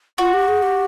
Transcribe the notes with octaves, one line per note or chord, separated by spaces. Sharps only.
F4 F#4
G4
G#4
G4